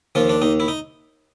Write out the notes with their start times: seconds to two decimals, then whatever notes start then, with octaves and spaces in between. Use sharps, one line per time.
0.15 D#2 F3 F4
0.29 D4
0.42 D#2 D#4
0.60 E4
0.68 D#4